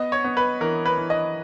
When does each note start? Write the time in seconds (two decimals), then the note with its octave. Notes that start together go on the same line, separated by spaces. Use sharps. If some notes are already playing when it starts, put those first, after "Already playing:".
Already playing: B3 D#5
0.12 C#5
0.24 B3
0.37 B4
0.61 E3 A#4
0.86 B4
0.98 E3
1.10 D#5